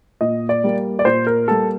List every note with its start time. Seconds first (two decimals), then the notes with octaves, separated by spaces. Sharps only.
0.21 A#2 D#5
0.49 D5
0.64 G3 A#3
0.99 D5
1.05 A#2 C5
1.27 A#4
1.48 G3 A#3 A4